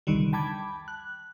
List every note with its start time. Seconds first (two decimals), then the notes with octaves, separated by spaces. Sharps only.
0.07 C2 F2 D3 D#3 G3
0.33 G5 A5 B5 D6 G#6
0.88 F#6